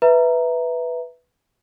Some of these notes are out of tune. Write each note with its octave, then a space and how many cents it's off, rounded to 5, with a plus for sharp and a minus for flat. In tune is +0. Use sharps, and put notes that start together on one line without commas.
B4 +0 E5 +0 A#5 +0